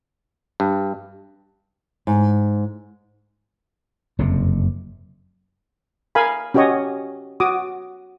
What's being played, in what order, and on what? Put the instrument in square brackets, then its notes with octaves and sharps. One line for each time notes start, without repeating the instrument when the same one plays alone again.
[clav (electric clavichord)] G2
[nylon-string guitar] G#2
[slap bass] F#1 F2 C3
[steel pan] A#4 F5 G#5 B5
C#4 F#4 G4 C#5 D#5
F#4 D6 D#6